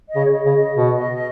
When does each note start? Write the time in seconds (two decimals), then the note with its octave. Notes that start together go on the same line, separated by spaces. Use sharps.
0.09 D#5
0.16 C#3
0.25 C#5
0.31 D#5
0.46 C#3
0.54 D#5
0.76 B2